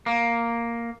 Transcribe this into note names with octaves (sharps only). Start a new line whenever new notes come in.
A#3